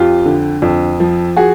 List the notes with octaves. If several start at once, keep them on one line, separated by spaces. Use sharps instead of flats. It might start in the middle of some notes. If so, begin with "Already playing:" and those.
Already playing: F2 F4 G4
D3
F2
F3
F#4 G#4